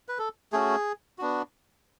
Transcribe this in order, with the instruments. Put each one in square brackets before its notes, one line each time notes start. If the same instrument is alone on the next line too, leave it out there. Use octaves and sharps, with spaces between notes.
[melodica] B4
A4
A3 C#4 F#4 G#4
B3 D4 F#4